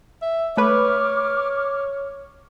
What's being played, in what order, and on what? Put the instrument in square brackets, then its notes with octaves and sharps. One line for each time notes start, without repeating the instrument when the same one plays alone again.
[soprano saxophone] E5
[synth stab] A3 B4 [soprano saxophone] C#5 [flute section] D6 F6